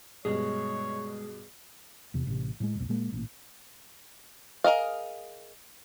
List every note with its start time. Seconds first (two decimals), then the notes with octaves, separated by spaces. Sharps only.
0.25 G2 B2 G#3 G#4 C#5
2.14 E2 C3
2.27 A1 C3
2.60 A2 F#3 G#3
2.75 F1 B1
2.89 A#2 G#3 A#3
3.12 A1 A#2
4.64 G#4 A#4 D#5 F5